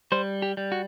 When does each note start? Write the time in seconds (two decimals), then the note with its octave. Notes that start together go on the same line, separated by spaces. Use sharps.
0.12 G3 C5
0.42 G4
0.57 G3
0.72 F#4